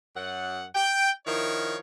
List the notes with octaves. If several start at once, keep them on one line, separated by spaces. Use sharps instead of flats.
F#2 F#5
G5
D#3 F3 E4 A#4 C#5